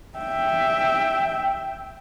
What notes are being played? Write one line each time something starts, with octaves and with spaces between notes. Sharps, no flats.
E5 G5